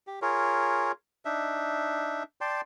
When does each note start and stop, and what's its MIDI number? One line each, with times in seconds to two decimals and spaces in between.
0.07 0.19 67
0.22 0.92 65
0.22 0.92 68
0.22 0.92 70
0.22 0.92 73
1.25 2.23 62
1.25 2.23 63
1.25 2.23 76
2.41 2.61 74
2.41 2.61 79
2.41 2.61 81
2.41 2.61 84